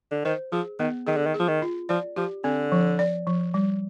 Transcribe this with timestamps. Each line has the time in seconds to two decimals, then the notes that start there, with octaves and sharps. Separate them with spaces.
0.11 D3
0.25 D#3 C5
0.52 F3 G#4
0.79 D#3 B3
1.07 D#3 G#4
1.17 D3
1.26 D#3
1.34 G#4
1.40 F3
1.48 D#3
1.62 F4
1.89 F3 D5
2.16 F3 G4
2.44 D3 C4
2.72 F3
2.99 D5
3.27 F3
3.54 G3